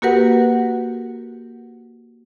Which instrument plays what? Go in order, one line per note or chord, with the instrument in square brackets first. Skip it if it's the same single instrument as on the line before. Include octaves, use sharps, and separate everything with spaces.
[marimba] A#3 F#4 G4 A#4 B4 F#5